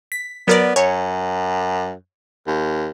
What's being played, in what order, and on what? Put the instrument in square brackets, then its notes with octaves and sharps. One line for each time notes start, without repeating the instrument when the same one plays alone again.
[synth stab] B6
[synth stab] F#3 A#4 D5 [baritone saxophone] B3
[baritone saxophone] F#2 [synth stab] C#5
[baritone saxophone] D#2